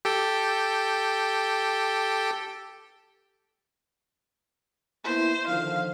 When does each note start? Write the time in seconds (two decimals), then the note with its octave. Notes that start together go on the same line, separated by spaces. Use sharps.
0.05 G4 A4 G5
5.04 A#3 B3 E4 C5
5.47 D3 D#3 F3 F5